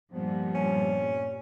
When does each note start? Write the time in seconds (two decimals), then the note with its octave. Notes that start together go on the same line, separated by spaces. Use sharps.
0.12 G2 A#2 F3 G3 B3
0.55 C#4